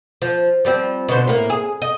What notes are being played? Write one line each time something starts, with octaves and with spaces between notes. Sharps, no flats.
F3
F3 G3 C4
B2 D3 C5
A2 A#3
G#4
D#5